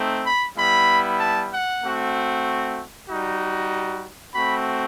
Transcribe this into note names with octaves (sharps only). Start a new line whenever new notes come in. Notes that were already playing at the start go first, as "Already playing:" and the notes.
Already playing: A3 C4 D#4
B5
G3 B3 E4 B5
A5
F#5
A3 C4 F#4
G3 D#4 F#4
A3 C4 F#4 B5